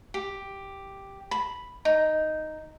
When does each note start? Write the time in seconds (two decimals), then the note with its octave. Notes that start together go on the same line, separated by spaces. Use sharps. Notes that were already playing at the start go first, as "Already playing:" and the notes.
0.14 G4
1.31 B5
1.85 D#4